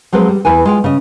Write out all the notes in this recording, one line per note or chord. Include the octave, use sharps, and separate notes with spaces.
F3 F#3 G#3 C4 B4
G3
E2 E4 B4 G#5
G#3 F4 G5
C#3 D#5